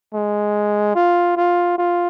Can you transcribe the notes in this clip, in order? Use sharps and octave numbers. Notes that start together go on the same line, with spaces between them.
G#3
F4
F4
F4